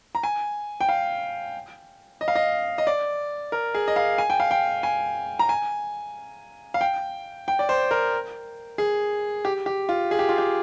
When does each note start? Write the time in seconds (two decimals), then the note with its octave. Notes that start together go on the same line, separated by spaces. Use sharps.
0.15 A#5
0.23 G#5
0.81 G5
0.89 F5
2.21 D#5
2.28 F5
2.35 D#5
2.78 D#5
2.87 D5
3.52 A#4
3.75 G#4
3.88 D#5
3.96 F5
4.18 G#5
4.30 G5
4.40 F5
4.51 G5
4.83 G#5
5.39 A#5
5.49 G#5
6.74 F5
6.81 G5
7.48 G5
7.59 D5
7.69 C5
7.91 A#4
8.78 G#4
9.45 G4
9.66 G4
9.89 F4
10.11 G#4
10.19 G4
10.29 F4
10.38 G4